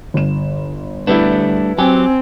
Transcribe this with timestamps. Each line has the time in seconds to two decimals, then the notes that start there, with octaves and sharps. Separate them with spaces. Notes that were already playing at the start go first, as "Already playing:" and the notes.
0.14 G1 E7
1.07 G3 A3 B3 D4 E4
1.78 F#3 C4 G4 G#5